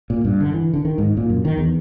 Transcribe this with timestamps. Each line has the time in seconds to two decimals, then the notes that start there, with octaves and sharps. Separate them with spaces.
0.10 A#2
0.24 G2
0.41 D3
0.54 E3
0.74 D3
0.85 D#3
0.98 G#2
1.17 A#2
1.30 F#2
1.45 D#3
1.58 E2